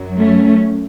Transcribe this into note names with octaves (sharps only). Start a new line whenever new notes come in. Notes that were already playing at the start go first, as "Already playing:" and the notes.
Already playing: F#2 F#3
A3 C#4